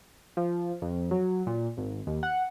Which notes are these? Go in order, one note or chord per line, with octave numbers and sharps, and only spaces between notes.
F3
F2
F#3
A#2
G#1
D#2
F#5